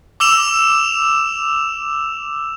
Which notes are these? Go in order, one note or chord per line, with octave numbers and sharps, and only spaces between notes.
D6 E6 E7 F7